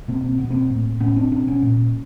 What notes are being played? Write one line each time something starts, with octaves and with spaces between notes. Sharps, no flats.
B2 A#3 C4
C4
B2 B3
A#3 C4
A2
A2 B3 C#4
C4 D4
B2 C4 D4
B3 C#4
A#2